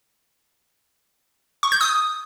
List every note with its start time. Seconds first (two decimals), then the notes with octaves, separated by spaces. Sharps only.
1.63 C#6
1.72 G6
1.81 D#6